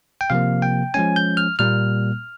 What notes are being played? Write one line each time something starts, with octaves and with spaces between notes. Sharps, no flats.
G5
C3 F3 A#3 F5
G5
F3 G#3 C#4 G#5
G6
F6
A#2 G3 A#3 F6